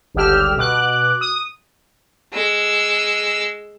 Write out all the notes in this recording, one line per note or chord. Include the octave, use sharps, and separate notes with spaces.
G1 C#2 D3 G4 E6 F6
B2 D6 F#6
D#6
G#3 E6